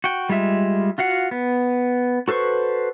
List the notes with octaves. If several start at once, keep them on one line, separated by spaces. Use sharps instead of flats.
F#4 G5
G3 G#3 F4 E5
F4 F#4 F5 F#5
B3
F#4 A4 B4 C5 C#6